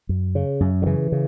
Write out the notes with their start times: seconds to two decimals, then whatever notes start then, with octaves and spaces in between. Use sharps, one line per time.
0.09 F#2
0.35 C#3
0.60 F#2
0.82 D3
0.86 C#3 E3
1.12 C#3